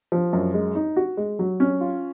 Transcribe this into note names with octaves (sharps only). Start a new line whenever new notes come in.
F3
F#2
G#3
D#4
F#4
G#3
F#3
C#4
F4